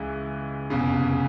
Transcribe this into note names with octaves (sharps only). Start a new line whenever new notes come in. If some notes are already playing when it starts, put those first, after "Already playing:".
Already playing: C#2 E3 G#3
F1 E2 C#3